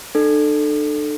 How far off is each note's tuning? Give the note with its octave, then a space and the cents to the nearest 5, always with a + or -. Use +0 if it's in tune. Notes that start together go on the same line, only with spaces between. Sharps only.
D4 +40 A4 +0